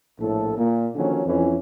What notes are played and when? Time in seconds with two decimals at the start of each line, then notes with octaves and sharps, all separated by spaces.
0.19 A#1 A2 A4
0.57 A#2
0.95 D3 D#3 F3 F#3 A#3 C#4
1.26 F2 E3 C#4